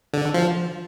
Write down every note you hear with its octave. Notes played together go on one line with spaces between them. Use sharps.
D3
F3